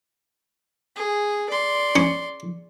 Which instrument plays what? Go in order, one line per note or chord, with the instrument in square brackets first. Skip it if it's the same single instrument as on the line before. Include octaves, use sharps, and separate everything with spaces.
[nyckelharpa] G#4
D5 C6
[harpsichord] C#4